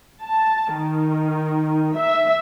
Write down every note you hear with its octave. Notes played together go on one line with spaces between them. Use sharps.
A5
D#3
E5